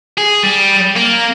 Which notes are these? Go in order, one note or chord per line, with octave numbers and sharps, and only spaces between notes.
G#4
G3
A#3